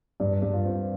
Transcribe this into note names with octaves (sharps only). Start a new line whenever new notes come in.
G2
G2
F4
C4